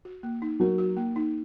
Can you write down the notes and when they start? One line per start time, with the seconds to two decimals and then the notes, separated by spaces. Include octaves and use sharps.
0.05 F#4
0.23 A#3
0.42 D#4
0.60 F#3 A#4
0.78 F#4
0.97 A#3
1.16 D#4